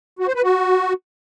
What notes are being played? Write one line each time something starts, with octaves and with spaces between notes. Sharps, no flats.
F#4
C5
B4
F#4